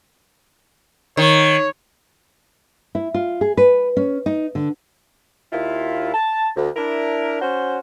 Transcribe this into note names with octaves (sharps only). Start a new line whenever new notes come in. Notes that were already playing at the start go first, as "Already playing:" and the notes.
D#3 C#5
E4
F4
G#4
B4
C#4
D#4
D3
D#2 E4 F4
A5
D2
D4 E4 A#4
C#4 F#4 C5